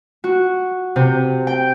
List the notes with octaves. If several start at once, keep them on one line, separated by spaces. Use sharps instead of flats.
F#4
C3
G5